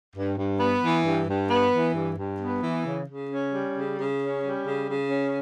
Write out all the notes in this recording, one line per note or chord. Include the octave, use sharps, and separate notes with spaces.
G2
G2
B3
E3
G2
G2
B3
E3
G2
G2
B3
E3
C#3
C#3
C#4
G3
C#3
C#3
C#4
G3
C#3
C#3
C#4